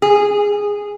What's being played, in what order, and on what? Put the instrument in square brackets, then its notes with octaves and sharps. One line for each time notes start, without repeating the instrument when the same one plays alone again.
[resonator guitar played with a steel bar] G#4